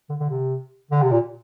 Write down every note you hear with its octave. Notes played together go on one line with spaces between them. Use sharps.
D3
D3
C3
D3
C3
A#2